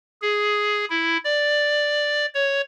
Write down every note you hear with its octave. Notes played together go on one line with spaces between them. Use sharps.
G#4
E4
D5
C#5